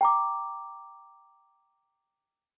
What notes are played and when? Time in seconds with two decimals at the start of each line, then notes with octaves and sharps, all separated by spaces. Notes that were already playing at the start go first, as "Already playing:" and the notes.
0.01 G5 A#5 D6